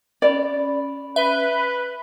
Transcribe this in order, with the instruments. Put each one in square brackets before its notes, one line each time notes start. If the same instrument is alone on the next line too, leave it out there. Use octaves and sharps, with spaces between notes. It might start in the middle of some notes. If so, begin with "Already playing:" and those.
[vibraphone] C#4 B5 [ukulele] D5
[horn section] B4 [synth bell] E5 G7